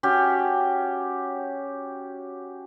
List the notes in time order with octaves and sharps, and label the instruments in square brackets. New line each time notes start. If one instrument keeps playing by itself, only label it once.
[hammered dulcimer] C#4 F#4 G4